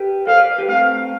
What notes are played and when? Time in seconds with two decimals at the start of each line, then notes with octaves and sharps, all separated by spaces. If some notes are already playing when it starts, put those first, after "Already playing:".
Already playing: G4 B4
0.27 A4 C5 F5
0.37 B4 D5
0.58 G4 B4
0.69 A3 C4 F5